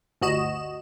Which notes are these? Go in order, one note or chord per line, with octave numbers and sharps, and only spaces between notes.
G1 D2 F#4 D#5 E7